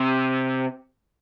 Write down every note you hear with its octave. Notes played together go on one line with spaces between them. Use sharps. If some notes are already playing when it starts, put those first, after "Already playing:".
Already playing: C3